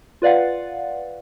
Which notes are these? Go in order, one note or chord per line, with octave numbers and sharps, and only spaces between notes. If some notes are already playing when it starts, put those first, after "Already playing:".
F4 B4 D5 F5 F#5